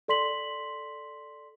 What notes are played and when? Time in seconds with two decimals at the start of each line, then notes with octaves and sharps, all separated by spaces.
0.08 A4 D5 C6 B6 F#7